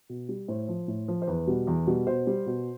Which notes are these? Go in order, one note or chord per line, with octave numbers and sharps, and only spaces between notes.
B2
G3
A2 C5
F3
A2
F3
C5
E2 B4
B2 G3
E2
B2 G3
B2 C5
G3
B2